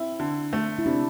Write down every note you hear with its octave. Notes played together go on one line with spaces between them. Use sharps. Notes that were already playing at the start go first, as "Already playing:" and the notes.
Already playing: C4 E4
D3
A3
E4
C3 D4